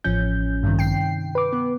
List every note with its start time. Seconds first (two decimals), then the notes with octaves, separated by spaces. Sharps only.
0.04 A1 F3 C#4 G6
0.63 G2 C3 D#3
0.79 G5 C7
1.35 B4 D6
1.53 B3